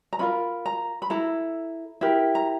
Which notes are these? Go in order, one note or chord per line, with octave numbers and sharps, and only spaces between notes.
A#5
C#4 F4 A#4 B5
A#5
B5
E4 A4 A#5
E4 G4 A#4
A#5